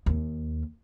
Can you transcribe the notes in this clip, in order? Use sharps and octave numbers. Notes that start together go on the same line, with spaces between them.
D#2